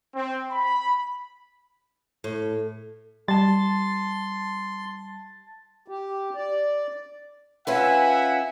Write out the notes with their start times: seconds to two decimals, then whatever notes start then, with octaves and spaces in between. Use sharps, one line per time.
0.15 C4
0.51 B5
2.24 A2
3.28 G3 A5 C6 A6
5.88 G4
6.34 D5
7.67 C#4 F4 B4 E5 F#5 G#5